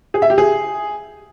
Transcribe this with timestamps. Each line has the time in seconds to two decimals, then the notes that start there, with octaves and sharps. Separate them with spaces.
0.14 G#4
0.22 E5
0.30 G4
0.38 G#4